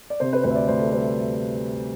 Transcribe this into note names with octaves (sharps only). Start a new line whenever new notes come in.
D5
C3 C5
B4
D2 B4
E5
D5
D2 C5
A4
G3 B4